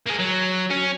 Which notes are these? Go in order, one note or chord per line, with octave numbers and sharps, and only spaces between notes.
A#3 G#4
F#3
C#4